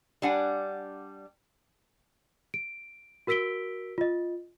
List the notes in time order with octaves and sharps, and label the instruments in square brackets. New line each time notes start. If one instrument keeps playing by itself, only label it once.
[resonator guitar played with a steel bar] G3 D4 F#5 G#5
[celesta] D7
F#4 A#4 E6 B6 D7 G7
F4 D#5